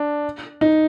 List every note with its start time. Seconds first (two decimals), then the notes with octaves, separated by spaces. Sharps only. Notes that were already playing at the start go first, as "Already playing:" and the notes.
Already playing: D4
0.61 D#4